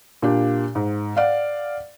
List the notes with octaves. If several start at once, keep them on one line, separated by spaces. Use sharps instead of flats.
A#2 D4 G4
G#2
D5 F5 F#5